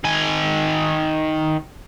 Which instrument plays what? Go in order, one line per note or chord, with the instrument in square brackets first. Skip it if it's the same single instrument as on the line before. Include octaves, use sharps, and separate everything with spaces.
[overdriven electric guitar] D#3 G#5